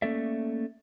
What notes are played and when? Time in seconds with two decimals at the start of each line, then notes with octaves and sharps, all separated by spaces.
0.02 A3 A#3 C#4 A4 D5 E5